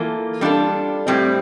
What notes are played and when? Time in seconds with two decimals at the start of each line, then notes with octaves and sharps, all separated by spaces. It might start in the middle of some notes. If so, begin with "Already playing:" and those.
Already playing: E3 A#3 F4 A4
0.41 G3 D4 F4 A4
1.07 A2 G3 C4